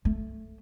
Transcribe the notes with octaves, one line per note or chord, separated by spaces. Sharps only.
A3